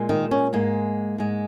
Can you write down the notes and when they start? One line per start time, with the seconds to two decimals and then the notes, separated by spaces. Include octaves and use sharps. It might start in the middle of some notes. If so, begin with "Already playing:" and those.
Already playing: A#2 G#3
0.09 D#3 D#4
0.31 C#4
0.53 G#2 G#3 A#3
1.18 G#2 G#3